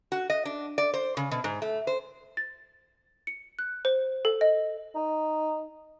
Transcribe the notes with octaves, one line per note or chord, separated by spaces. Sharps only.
F#4
D#5
D4
D5
C5
C#3
B2
G#2
A3
C5
A6
C#7
F#6
C5
A4
D#5
D#4